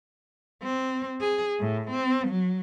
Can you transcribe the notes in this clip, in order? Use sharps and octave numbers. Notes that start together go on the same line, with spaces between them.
C4
G#4
A2
C4
F#3